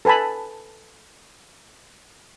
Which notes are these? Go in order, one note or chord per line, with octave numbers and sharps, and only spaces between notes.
A4 B4 G#5 A5 B5